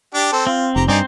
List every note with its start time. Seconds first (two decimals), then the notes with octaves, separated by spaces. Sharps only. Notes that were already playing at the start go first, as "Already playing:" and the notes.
0.14 D4 G4 D6
0.32 C4 A4
0.47 C4 F4
0.76 F1 G4 A#5
0.89 G2 C4 D#4 C5 D5 G#5